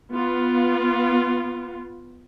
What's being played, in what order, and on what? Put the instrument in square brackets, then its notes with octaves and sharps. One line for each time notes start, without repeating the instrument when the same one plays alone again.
[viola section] B3 F4